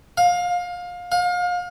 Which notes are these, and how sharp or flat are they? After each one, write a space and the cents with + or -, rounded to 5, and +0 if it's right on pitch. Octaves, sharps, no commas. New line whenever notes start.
F5 +25
F5 +35